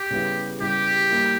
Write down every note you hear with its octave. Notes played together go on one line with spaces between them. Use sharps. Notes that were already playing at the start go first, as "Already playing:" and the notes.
Already playing: G4
C#3 G3 B3 E4
C#3 G3 B3 E4 G4
G3 A#3 E4